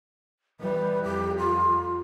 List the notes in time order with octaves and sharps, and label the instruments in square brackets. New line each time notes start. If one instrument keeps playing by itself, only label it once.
[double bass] E3 G3 [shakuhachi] B4
[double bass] F2 [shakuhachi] G4
[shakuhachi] F4